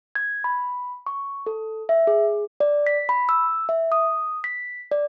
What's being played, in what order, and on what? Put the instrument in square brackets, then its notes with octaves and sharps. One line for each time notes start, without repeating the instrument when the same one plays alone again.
[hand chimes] G#6
B5
C#6
A4
E5
G#4
D5
B6
B5
E6
E5
D#6
B6
D5